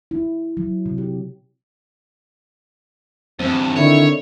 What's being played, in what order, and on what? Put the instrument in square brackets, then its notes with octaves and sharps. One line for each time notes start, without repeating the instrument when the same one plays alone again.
[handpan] E4
F#3
C3
G4
[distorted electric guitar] E2 G2 [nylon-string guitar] C4
[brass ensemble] D3 D#3 E4 [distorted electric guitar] C#5